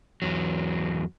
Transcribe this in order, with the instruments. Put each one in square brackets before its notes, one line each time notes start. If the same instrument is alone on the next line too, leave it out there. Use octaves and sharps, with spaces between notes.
[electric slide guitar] E2 F#3